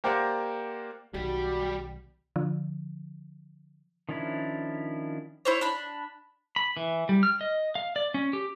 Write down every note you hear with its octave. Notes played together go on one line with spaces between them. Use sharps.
A#3 G4 A#4 C5 D5 F#5
B1 D#3 G3 F#4 G4
D3 F3
D#3 F3 C#4 D4 E4
E4 C5 C#5
D4 B5
B5
E3
G3
F6
D#5
F5
D5
C#4
G4